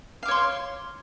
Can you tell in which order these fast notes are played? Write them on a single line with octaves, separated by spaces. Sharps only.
F5 D6 C#5 C6